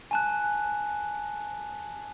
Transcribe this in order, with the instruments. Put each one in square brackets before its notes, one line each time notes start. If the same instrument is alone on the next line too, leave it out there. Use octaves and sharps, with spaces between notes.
[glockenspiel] G#5 A5 F#6